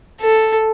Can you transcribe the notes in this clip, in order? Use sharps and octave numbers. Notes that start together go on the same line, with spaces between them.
A4